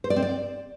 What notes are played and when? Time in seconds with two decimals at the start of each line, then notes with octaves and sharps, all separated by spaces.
0.04 C5
0.10 D5
0.16 C4
0.22 D5